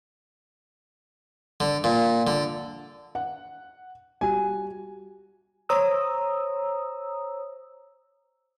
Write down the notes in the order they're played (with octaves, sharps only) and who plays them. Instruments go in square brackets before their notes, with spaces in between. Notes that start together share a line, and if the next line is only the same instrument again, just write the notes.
[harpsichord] D3
A#2
D3
[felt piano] F#5
[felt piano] G3 F#4 [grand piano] G#5
[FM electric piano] C5 C#5 A#5 D#6 E6